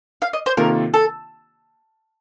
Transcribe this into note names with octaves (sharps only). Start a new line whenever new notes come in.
F5
D#5
C5
C3 D#3 A#3 F4 A4 A#4
A4